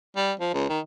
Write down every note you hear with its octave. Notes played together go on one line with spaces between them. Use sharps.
G3
F3
C#2
D#3